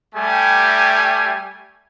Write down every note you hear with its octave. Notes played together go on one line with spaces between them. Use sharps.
G3 A3 G4 G#5